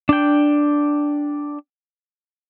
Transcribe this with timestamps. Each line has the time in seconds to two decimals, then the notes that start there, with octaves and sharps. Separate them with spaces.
0.09 D4 G5